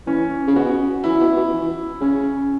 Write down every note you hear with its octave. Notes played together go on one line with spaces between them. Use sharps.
E3 C#4
C#3
B2 F#4
E3 E4
B2
B2
E3
C#3 C#4